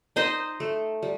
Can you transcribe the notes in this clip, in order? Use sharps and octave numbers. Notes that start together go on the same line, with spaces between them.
D#4 C5 D#5
A3
G3